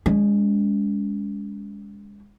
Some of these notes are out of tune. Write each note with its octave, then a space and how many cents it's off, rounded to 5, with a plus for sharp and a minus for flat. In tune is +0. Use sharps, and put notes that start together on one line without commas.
G#3 -25 C#4 +35